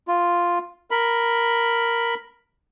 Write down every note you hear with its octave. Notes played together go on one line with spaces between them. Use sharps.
F4
A#4 B5